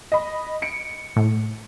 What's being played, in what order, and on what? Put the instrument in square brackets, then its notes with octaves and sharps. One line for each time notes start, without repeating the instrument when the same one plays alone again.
[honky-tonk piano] D#5 B5
C#7 D7
[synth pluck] A2